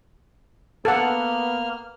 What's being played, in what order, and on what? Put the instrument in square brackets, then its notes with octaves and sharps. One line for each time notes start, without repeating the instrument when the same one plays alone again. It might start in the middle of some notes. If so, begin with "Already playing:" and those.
[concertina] A#3 F6 [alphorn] B3 [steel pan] A4 F#5